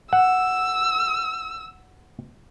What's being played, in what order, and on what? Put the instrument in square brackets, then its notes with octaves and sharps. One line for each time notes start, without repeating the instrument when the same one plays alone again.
[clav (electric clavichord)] F#5 [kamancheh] E6